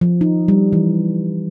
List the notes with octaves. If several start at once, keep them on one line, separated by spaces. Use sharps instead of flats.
F3
D#4
G3
E3